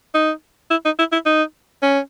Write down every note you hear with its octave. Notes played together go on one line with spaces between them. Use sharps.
D#4
E4
D#4
E4
E4
D#4
C#4